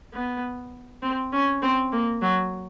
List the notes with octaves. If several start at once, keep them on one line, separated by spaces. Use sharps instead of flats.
B3
C4
C#4
C4
A#3
F#3